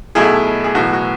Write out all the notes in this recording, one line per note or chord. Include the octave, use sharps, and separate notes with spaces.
B1 B2 A3 E4 G#4
G#4
B1 A2 E3 F#4
F#4